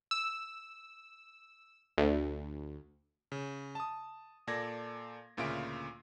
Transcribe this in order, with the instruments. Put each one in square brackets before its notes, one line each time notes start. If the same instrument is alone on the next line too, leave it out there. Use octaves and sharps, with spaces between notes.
[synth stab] E6
D2
[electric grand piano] C#3
A5 D#6
A#2 A4 D5 G#6 A#6
D2 A#2 C#3 F4 E5 D7